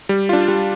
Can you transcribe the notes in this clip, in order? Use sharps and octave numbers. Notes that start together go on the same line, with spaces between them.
G3
D4 F4
G3